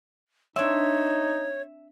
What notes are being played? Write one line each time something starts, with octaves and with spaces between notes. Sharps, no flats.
C4 D4 D#4 C#5 E5